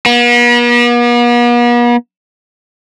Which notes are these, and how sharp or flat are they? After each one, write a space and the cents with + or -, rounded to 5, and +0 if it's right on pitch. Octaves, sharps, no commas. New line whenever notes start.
B3 -45